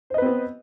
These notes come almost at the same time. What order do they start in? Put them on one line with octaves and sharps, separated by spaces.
C5 D#5 B4 C4 B3